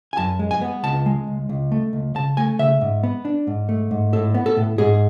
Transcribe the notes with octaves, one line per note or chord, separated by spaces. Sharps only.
G#5
F#2 A5
G#3
G#5
B3
C#2 A5
G#3
C#2
C#2
A3
C#2
C#3 A5
A3 G#5
C#3 E5
G#2
B3
D4
G#2
A3
G#2
A2 A4
B3
A4
A2
G#2 G#4